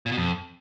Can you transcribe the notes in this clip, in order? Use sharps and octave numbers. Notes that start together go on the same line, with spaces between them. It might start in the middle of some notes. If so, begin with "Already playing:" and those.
A#2
B2
F2